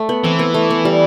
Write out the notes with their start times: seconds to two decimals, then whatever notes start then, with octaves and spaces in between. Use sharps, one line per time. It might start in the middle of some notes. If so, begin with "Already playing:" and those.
Already playing: A3
0.09 B3
0.24 E3 C4
0.39 B3
0.54 A3
0.70 B3
0.85 G3